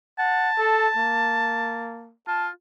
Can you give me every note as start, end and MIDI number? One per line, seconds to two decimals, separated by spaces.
0.19 0.50 78
0.19 2.06 81
0.58 0.89 69
0.96 2.14 58
2.27 2.49 65
2.27 2.47 81